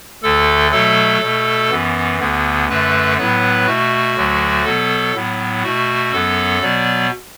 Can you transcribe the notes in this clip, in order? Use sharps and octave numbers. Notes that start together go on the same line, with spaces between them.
D2 D3 A3 A4
B2 F#3 A3 A4
B2 A3
F#2 E3 B3
D2 D3 B3
F#2 D3 A3 B4
A2 F#3 B3 B4
B2 A3 F#4
D2 D3 F#3 A3
B2 F#3 B3 A4
A2 F#3 B3
B2 A3 F#4
F#2 F#3 B3 A4
B2 F#3 B3 D5